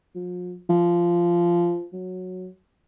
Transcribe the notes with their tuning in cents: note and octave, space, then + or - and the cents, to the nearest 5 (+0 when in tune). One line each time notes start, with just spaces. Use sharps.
F3 +40
F3 -15
F#3 -10